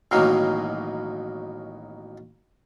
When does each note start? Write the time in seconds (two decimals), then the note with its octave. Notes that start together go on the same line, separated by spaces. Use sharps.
0.11 A1 B2 D#3 F#3 A#3